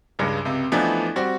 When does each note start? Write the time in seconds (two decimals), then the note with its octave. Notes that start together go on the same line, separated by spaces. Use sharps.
0.19 C#2 G2 C#3 G#3
0.45 C#2 C3
0.72 E3 F3 A3 B3 D4 D#4
1.16 G3 C4 F#4